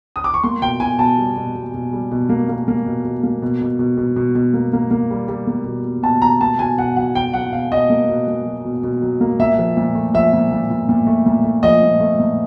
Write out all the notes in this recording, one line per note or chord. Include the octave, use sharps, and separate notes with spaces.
D#6
D6
C#6
A#3 C6
B2 G5
B2 G#5
B2 A5
G3
B2
B2
B2
G3
B2
A#3
A#3
A#3
B2
B2
A#3
B2
B2
B2
B2
B2
B2
A#3
A#3
A#3
G3
G3
A#3
B2
B2
B2 A5
B2 A#5
A#3 A5
B2 G#5
B2 F#5
F#3 F#5
B2 G5
F#3 F#5
B2 F5
B2 D#5
A#3
B2
A#3
F#3
B2
B2
F#3
A#3
A#2 E5
F3
A#2
A3
F3 E5
A#2
A#2
A#2
A#2
A3
A#2
A3
F3 D#5
A#2
A3
A#2